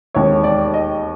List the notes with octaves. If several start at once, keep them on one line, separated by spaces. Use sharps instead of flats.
E1 D#2 D#3 G#3 C4 C#5
D5
D#5